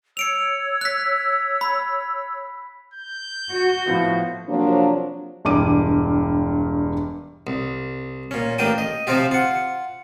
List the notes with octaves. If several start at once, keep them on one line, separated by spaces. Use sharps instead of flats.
C#5 E6 C#7 D7 F7
F#6 B6
B5
G6
F#4
A2 F3 B3
C3 F3 F#3 A#3 D4
E1 G2 D6 D#7
C2
A#2 C#4
A1 A#3 D4 G5 D#6
D#5
C3 F3 C4 F4 G4
F4 F#5